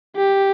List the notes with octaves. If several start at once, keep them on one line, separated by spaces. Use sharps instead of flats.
G4